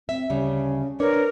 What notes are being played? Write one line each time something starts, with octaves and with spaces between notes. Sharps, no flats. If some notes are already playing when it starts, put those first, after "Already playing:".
C4 E5
D2 C#3 G3 C#4
D4 A#4 B4 C#5